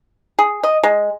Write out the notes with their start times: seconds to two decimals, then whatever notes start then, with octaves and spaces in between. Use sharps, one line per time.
0.39 G#4
0.63 D#5
0.83 G#3